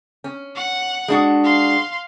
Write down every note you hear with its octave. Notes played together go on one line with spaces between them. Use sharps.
C#4
F#5
G#3 D4 F#4
F5 C6